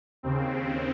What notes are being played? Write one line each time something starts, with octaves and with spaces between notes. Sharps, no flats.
D#2 C#3 C4